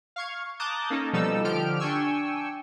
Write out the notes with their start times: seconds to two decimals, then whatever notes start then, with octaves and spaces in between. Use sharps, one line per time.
0.16 F5 C#6 G#6
0.60 A5 A#5 D6 D#6 F#6 G6
0.90 A#3 C#4 D#4 A4
1.13 B2 F3 G3 D#4 A4 E6
1.44 D3 F3 G4 F6 D7
1.80 D4 G5 G#5 C#6 E6